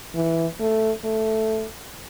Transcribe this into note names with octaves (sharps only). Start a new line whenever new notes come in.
E3
A3
A3